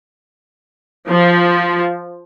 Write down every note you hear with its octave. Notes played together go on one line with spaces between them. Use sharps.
F3